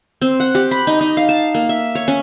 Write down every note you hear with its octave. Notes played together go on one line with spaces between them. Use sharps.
C4
F#5
G4
B5
D#4
D#4
F5
A5
A#3
E5
C#5
C#4